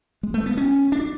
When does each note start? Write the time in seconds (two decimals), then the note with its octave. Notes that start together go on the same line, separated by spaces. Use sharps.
0.23 G#3
0.34 A3
0.46 B3
0.57 C#4
0.92 D4